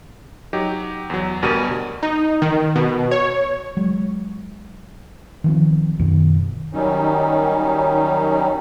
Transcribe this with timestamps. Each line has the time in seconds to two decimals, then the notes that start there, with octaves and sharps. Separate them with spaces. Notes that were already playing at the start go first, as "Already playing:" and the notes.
0.53 F#3 D#4 G4
1.10 E2 F#3
1.42 D2 B2 G3 A#4 D#7
2.03 D#4
2.42 D#3
2.76 B2
3.11 C#5
3.77 F#3 G#3
5.44 D#3 F3 C4
5.99 F#2 B2 D#3
6.73 D#3 F#3 G3 C#4 D#4